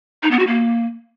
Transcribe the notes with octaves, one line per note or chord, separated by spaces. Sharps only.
D#4
B3
F#4
A#3